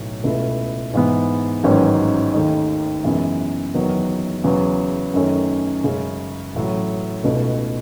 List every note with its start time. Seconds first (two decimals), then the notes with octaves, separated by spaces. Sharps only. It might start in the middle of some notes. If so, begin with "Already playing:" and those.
Already playing: B1 A2 F#3
0.24 C#2 B2 A3 E4
0.93 G#2 E3 B3
1.64 A1 G#2 D#3 F#3 C#4
2.34 D#2 D#3 A3 D#4
3.04 F#2 C#3 E3 G#3 B3
3.74 F#1 E2 D#3 F#3 B3
4.44 E2 C#3 F#3
5.14 F#2 D#3 A3 C#4
5.84 F#2 C#3 G#3 C#4
6.54 A1 A2 F#3
7.24 C#2 B2 A3 D#4